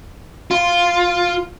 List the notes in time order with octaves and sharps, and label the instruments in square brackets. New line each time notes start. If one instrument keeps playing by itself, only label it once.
[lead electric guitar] F4